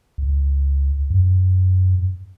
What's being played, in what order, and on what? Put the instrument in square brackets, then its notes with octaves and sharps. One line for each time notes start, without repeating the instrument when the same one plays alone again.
[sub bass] C#2
F#2